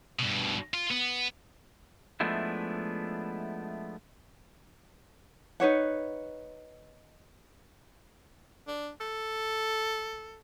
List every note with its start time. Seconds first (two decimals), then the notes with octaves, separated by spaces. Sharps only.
0.19 G2 B2
0.74 F4
0.91 B3
2.20 F3 G#3 A3 B3 D4 E4
5.60 D#4 B4 C#5 F#5
8.68 D4
9.01 A4